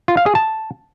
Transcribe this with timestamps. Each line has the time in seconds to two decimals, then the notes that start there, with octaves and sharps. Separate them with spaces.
0.08 F4
0.17 F5
0.26 G#4
0.35 A5